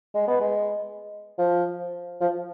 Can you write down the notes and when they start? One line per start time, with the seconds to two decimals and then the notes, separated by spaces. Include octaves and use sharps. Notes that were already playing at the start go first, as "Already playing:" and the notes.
0.15 G#3
0.28 B3
0.40 G#3
1.38 F3
2.21 F3